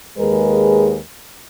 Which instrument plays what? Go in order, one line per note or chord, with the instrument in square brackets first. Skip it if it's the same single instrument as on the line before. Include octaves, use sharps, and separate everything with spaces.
[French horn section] D#2 G#3 G#4 A#4 B4